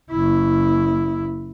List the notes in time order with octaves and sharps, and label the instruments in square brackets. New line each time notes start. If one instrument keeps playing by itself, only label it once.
[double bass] F#1 E4